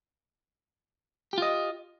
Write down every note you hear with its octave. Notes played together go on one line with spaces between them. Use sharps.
F4 G4 D#5